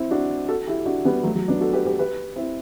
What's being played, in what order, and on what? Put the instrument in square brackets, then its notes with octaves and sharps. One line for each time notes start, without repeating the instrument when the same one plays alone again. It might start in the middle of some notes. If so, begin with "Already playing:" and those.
Already playing: [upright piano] C4 E4
D4 F#4
F#4 A4
E4 G4
D4 F#4
G3 B3
F#3 A3
F#3
B3 D4
F#4 A4
G4 B4
G4 B4
G4 B4
C4 E4